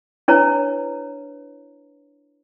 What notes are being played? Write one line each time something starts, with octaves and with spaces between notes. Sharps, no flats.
D4 E4 B4 C#5 A#5